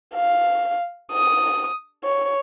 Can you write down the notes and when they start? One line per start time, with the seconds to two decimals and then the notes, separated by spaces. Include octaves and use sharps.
0.15 F5
1.13 D#6
2.04 C#5